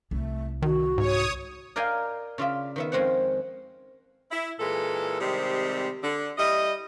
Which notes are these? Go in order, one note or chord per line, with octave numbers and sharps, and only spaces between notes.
C2 A3
D#3 F#4
G#2 C#5 D#6
A#4 D5 D#5 F5 G5 G#5
C#3 F4 D5 E5
D#3 B3 E5
F2 D#3 G#3 C4 C#4 F#5
E4
A#2 E3 G#3 A4
C3 D#3 G3 G#3 C4
D3
G3 E4 D#5